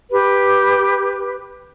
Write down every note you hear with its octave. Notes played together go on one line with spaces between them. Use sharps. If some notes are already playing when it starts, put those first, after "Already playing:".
G4 B4